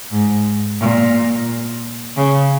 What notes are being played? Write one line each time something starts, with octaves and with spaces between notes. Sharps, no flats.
G#2
A#2
C#3